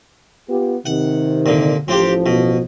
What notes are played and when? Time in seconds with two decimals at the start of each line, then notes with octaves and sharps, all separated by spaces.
0.49 B3 F4 G4
0.86 C3 D#3 F#5
1.46 A#2 D3
1.88 A1 F3 C4 F4 G4
2.26 B2